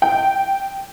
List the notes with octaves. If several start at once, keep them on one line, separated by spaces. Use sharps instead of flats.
G5